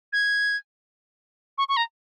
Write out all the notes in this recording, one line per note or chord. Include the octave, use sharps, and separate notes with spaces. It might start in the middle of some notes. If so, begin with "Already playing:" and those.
G#6
C#6
C#6
A#5